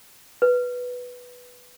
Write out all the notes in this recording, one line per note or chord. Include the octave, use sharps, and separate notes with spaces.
B4